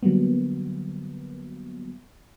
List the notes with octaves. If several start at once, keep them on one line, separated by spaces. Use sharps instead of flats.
D3 F#3 G3 A#3 B3